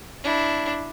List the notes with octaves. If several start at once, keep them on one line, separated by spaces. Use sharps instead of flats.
D4 E4